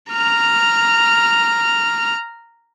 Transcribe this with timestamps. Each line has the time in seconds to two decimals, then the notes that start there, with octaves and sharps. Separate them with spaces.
0.11 A#5 F6